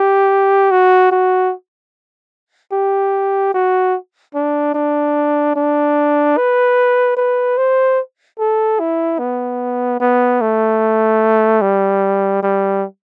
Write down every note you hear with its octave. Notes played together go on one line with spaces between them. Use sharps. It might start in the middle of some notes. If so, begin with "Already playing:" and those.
Already playing: G4
F#4
F#4
G4
F#4
D4
D4
D4
B4
B4
C5
A4
E4
B3
B3
A3
G3
G3